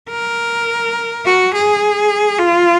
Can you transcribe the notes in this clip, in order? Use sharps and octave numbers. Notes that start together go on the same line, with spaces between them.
A#4
F#4
G#4
F4